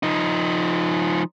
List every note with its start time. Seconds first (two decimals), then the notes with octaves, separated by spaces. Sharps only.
0.03 F3 D#4